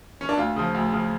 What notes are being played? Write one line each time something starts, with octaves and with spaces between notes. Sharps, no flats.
C#4
D4
D2 F4
C#3 F3
D2
C#3 F3